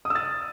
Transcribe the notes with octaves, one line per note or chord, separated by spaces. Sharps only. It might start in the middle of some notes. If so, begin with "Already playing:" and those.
D#6
E6
A6